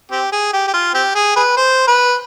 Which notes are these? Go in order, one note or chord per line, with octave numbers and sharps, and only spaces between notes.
C4 G4
G#4
G4
G4
F4
C4 G4
G#4
G#4 B4
C5
B4